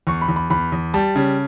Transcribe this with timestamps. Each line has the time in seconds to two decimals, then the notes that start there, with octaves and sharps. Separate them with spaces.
0.07 E2 C#6
0.21 B5
0.28 E2
0.36 B5
0.50 E2 B5
0.72 E2
0.94 G3 A5
1.15 C#3